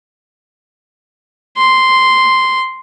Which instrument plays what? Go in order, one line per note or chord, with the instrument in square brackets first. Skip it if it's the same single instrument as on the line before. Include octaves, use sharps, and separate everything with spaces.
[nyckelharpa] C6